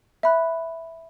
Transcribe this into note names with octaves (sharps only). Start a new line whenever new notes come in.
E5 B5 F#6